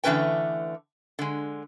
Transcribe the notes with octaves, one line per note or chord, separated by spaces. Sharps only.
D3 E3 A3 C#4 B4 G5
D3 G#3